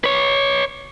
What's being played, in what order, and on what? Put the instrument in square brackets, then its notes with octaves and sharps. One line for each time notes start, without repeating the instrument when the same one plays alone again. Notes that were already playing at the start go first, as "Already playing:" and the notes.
[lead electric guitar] B4 C#5